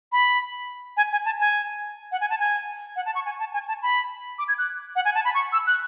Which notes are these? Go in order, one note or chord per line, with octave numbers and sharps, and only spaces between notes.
B5
G#5
G#5
A5
G#5
F#5
G#5
A5
G#5
F#5
A5
C#6
G#5
A5
G#5
A5
B5
D6
G#6
F#6
F#5
G#5
A5
B5
C#6
E6
F#6